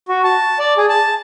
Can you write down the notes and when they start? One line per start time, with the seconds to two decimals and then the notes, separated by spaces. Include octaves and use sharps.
0.08 F#4
0.24 A5
0.59 D5
0.77 G#4
0.89 A5